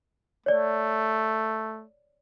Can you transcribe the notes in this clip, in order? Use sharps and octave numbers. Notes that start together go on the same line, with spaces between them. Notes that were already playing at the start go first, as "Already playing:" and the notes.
A3 C#5 D5